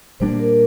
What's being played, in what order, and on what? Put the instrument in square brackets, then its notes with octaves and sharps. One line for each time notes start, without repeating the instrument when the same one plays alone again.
[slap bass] A#2 G3 A#3 D4 [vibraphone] C5
[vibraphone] A#4